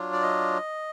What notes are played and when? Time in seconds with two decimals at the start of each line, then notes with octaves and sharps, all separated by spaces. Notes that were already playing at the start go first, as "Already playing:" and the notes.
Already playing: F#3 D4 F4
0.13 D5
0.22 D#5